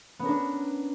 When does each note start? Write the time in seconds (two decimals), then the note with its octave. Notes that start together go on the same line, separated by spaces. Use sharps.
0.19 B3
0.22 C#4
0.25 A#4
0.28 D4